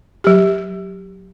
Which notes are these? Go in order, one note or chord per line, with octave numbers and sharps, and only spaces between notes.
F#3 G4